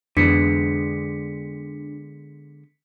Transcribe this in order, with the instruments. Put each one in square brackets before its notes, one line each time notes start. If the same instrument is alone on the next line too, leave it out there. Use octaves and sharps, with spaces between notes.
[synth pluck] F2 E3 [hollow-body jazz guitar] D3 G#3 B3 [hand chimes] D4 [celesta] B6 C#7